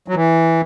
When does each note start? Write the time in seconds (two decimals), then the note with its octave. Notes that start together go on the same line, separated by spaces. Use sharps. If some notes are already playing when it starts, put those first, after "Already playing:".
0.08 F#3
0.14 E3